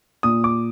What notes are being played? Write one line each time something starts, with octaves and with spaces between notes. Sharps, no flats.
A#2 D#6
D6